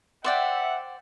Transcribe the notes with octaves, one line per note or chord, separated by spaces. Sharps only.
C5 D5 E5 F#5 G5